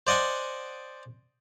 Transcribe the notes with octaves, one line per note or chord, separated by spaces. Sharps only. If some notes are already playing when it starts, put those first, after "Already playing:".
C5 D5 D#5 F#5 G#5